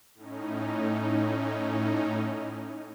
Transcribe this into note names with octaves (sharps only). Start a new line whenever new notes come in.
A2 C#4 D#4